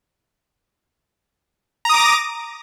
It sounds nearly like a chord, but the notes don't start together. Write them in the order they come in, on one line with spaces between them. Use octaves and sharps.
A#5 D#6 D6 A#6